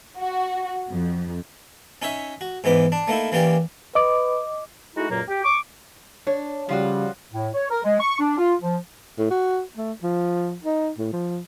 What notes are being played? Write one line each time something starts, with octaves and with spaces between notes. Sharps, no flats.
F#4
F2
C#4 D#4 C#5 E5
F#4
G#2 E3 B3 D#4 D6
D4
A3 A#3 D#4 E4
E3 A#3 C#4 G4 D5
B4 D#5 D6
G#3 A3 D#4 E4 F#4
C#2 F#2 A#2 F#3 A#3 A#5
G4
C#6 D6
D4 C#5
C#3 F3 G3 F4 F#4
A2
C#5
A#4
G#3
C#6
D4
F4
F3
A2
F#4
A3
F3
D#4
A2
F3